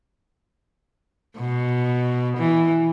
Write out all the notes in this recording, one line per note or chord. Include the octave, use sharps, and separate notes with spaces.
B2
E3